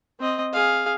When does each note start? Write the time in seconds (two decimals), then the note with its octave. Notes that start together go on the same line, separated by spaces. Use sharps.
0.20 C4 D#5
0.53 G#4 F5